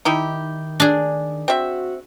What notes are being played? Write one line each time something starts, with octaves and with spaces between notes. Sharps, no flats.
D#3 D#4 E4 G4
D4 G#4
C4 F#4 E5